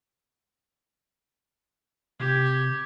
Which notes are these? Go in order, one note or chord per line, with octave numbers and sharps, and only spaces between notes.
C3 G4 G#6